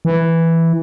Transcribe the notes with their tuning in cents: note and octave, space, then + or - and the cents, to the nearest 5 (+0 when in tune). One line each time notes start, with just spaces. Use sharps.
E3 +0